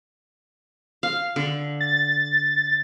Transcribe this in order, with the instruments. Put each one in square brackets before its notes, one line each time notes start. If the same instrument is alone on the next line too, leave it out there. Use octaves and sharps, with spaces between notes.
[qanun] F5
D3
[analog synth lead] A6